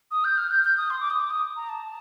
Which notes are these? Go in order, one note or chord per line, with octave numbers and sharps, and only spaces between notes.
D#6
G6
F6
G6
G6
D#6
C6
D6
D#6
D6
D#6
A#5
A5